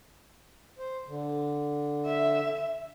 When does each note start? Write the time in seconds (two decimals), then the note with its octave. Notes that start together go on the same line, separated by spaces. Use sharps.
0.78 C5
1.07 D3
2.06 E5